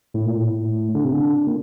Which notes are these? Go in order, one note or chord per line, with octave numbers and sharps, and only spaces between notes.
A2
A#2
A2
D3
C3
D3
A#2